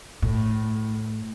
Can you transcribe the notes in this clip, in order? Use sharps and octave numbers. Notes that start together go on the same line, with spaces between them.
A2